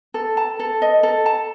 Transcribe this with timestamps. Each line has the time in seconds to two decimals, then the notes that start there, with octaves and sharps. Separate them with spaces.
0.14 A4
0.37 A5
0.60 A4
0.82 D#5
1.03 A4
1.26 A5